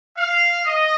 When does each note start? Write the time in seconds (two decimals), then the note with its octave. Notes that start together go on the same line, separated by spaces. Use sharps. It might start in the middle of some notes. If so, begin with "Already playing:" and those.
0.17 F5
0.66 D#5